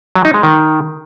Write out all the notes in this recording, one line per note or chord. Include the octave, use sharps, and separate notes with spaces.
F#3
D#4
G#3
D#3